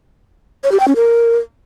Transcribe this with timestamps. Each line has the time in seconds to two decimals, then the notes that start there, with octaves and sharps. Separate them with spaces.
0.64 C#5
0.72 G4
0.80 G5
0.88 C#4
0.96 A#4